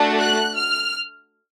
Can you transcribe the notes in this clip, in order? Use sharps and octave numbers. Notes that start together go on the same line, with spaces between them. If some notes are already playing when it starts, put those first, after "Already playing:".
Already playing: A3 D4 F#4
F#6
F6